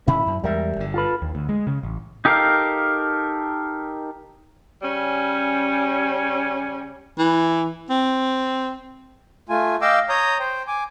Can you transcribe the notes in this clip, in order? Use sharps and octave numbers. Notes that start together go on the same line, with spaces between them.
A#2 D#3 C#4 E4
F#2
E2 G3 G#3 A#4 E5
G1 D3
F4 A4 B4
D#2
D2
G#3
C#3
A1
D#4 G4 A4 A#4 F5
C#3 G3 C#4
E3
C4
A3 F4 G#5
D#5 F5 G5 D6 E6
C#5 A#5 D#6 G6
C5 G5
G#5 D6